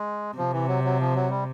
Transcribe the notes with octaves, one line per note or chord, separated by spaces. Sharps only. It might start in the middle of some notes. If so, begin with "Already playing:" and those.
Already playing: G#3
C3 F3
E3
F#3
F#3
F3
F#3
G3